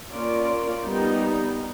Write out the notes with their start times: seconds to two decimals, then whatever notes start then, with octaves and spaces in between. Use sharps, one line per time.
0.12 A#3 C#4 F4 A#4 D5
0.83 G3 B3 D#4